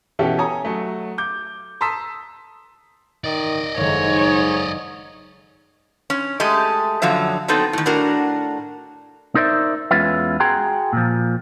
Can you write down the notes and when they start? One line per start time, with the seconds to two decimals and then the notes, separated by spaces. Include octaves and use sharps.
0.19 B2 E3 C#4 E4 G4 A4
0.38 A4 C#5 G#5 A#5 D#6
0.65 F#3 A3
1.18 D6 G6
1.81 A5 A#5 C6 D#6 E6 B6
3.24 D#3 D5 D#5
3.77 F#1 G#2 D#3 A3 C#5
6.10 C#4
6.40 G#3 A3 G4 D#5
7.02 F#2 D3 F3 F#3 E5
7.48 F#3 B3 C4 D#4 A4
7.73 A2 D#3
7.86 A2 D4 F#4 A#4
9.35 D#4 A#4 C5 D5 E5
9.91 E2 G#3 C#4 F4 B4 E5
10.40 F#4 G#4 G5 A#5 C6
10.93 A#2 F3